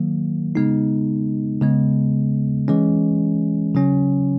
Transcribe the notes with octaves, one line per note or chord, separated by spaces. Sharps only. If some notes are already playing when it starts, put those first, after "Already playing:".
Already playing: D#3 F#3 A#3
C#3 G#3 B3 D#4
C#3 G#3 B3
E3 G#3 C#4
C#3 F#3 C#4